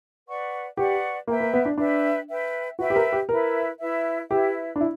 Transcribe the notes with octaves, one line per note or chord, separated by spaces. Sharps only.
B4 D5 F#5 C#6
G4 B4 D5 F#5 C#6
A#3 B4 E5 G5
A#3
B3
D4
D4 B4 E5 G5
B4 E5 G5
F#4 B4 E5 G5
G4
A#4
G4
E4 A#4 B4 E5
E4 B4 E5
E4 G4 B4 E5
D4
E4